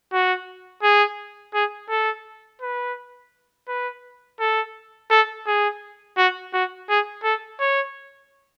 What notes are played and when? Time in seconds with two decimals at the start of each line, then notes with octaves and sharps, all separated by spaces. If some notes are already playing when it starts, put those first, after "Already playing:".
0.13 F#4
0.83 G#4
1.54 G#4
1.90 A4
2.62 B4
3.68 B4
4.40 A4
5.11 A4
5.47 G#4
6.17 F#4
6.54 F#4
6.89 G#4
7.24 A4
7.60 C#5